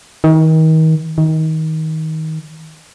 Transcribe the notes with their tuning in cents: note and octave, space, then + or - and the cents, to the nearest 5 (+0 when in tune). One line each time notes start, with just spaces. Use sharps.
D#3 +35
D#3 +25